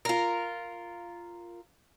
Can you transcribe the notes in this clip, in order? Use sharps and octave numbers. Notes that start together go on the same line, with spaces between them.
F4 A#4